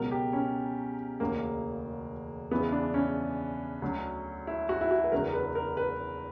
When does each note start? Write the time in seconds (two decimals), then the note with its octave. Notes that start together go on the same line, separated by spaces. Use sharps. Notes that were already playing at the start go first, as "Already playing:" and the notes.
Already playing: C#2 B2 F#3 A#4
0.11 G4
0.33 C#4
1.20 E1 D2 C#3 A#3
2.51 E2 C#3 E3 B3
2.72 D4
2.94 C#4
3.82 D2 D3 F#3
4.47 E4
4.69 F#4
4.81 E4
4.91 F#4
5.04 B4
5.12 F#1 E2 D3 F#3 A#4
5.33 B4
5.55 A#4
5.77 B4